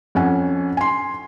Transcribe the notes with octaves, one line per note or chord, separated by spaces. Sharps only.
F2 C#4 F#5 G#5
G#5 C6